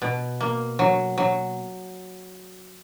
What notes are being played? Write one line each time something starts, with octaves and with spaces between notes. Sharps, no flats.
B2
A#3
F#3
F#3